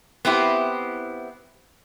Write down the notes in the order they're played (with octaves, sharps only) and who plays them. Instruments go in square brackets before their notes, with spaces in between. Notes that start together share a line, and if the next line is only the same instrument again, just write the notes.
[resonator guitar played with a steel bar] B3 C4 E4 G4